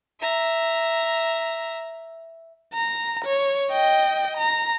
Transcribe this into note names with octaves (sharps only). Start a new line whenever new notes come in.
E5 A#5
A#5
C#5
D#5 G5
A#5